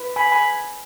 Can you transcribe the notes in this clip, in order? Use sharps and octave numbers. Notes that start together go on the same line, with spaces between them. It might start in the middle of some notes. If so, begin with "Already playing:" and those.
Already playing: E4 B4
G#5 B5
G#5 B5